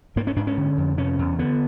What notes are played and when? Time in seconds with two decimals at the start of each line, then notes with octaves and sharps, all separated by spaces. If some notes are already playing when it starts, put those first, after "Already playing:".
0.16 G#2 A#3
0.27 C#4
0.36 G#2 D4
0.47 C#4
0.57 D3
0.78 F2
0.98 C3 C#4
1.19 E2
1.39 D3 B3